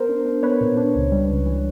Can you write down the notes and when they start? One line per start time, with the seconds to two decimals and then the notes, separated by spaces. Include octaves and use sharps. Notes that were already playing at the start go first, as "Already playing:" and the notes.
Already playing: B3 A#4 C5
0.09 D4
0.25 D4
0.43 B3 B4 C#5
0.61 A#2
0.77 D4
0.95 C#2
1.12 G3
1.30 C#2
1.46 E3